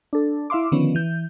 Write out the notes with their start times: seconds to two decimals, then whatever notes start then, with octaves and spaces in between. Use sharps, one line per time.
0.13 D4 A4
0.50 E4 E5 F5 C6 D6
0.72 D3 D#3 F3 B3 C#4
0.95 E3 G6